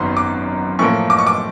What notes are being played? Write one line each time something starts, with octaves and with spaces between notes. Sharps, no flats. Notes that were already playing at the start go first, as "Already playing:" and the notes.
Already playing: G#1 F#2 D#3 F#3 B3 C6
D6
A2 F3 A#3 C#6
D6
C#6
D6